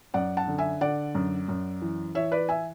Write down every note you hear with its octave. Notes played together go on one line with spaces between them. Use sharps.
F#2 D5 F#5
F#5 A5
D3
E5 G#5
D3 D5 F#5
F#2
F#2
E3
E3 C#5 E5
B4 D5
E5 G#5